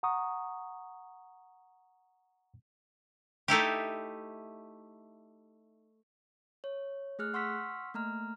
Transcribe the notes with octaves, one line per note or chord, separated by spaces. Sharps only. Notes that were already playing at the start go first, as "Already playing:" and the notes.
F#5 A#5 C#6 D#6
A3 D#4 E4 G4
C#5
A3 G#4 F6 F#6
F#5 C6 C#6 E6 F6 B6
A3 A#3 A#5 F6